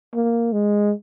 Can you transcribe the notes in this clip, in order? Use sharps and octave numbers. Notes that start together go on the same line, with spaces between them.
A#3
G#3